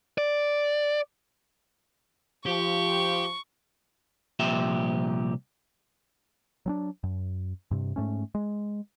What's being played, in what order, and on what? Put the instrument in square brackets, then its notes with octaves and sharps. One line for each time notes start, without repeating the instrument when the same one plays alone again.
[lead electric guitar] D5
[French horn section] F3 [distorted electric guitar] G4 [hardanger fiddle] C#6
[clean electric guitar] C2 A#2 F3 G4 E5
[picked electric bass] F#3 C4 D4
F#2
G2 C3
G#2 A3 C#4
G#3